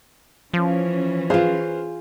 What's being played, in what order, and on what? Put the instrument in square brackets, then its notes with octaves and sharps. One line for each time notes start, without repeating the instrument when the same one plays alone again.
[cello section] E3 C#4 [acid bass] F3
[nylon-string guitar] F4 G#4 [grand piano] B4 C5 F5